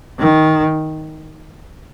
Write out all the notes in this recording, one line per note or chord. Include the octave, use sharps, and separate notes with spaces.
D#3